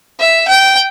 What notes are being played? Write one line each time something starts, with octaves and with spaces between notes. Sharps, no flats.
E5
G5